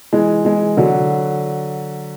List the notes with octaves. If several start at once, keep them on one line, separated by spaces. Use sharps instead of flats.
E3 G#3
E3 G#3
D3 F#3